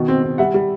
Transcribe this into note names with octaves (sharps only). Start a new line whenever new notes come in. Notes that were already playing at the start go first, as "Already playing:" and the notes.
Already playing: B2 D#3
C4
C4
G3 E5 F#5
G3